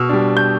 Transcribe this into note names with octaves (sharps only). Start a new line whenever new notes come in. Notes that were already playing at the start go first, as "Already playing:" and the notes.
Already playing: B2 E6 F6
G3 D4
G6